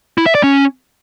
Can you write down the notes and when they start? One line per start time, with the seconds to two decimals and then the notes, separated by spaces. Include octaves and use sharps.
0.18 E4
0.26 E5
0.35 D5
0.43 C#4